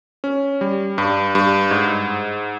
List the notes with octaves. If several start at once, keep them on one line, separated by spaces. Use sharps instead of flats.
C#4
G3
G2
G2
G#2